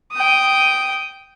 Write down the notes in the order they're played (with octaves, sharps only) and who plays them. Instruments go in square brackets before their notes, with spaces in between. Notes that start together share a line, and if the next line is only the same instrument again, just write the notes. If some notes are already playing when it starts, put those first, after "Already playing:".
[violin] G5 D#6